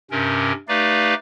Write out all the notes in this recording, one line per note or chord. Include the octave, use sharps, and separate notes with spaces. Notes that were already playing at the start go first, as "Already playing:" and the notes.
G2 C3 C#4 A#4
A3 D#4 G4 B4 D5 F5